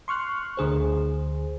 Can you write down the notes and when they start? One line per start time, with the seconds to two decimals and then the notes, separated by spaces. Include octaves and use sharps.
0.08 C6 C#6 F6 F#6
0.57 D2 D3 G#4 C5